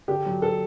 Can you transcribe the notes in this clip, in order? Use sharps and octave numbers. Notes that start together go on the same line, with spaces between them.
D3 G4
F#3
A4